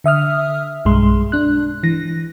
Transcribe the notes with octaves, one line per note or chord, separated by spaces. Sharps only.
D3 E5 D#6 F6
B1 G2 G#3 C6
D4 F#6
E3 A#6